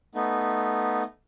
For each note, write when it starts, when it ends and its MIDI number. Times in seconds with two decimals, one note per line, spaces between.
0.15 1.03 57
0.15 1.03 59
0.15 1.03 63